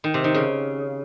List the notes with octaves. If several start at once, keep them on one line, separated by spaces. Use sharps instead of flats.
D#3
C3
D#3
C#3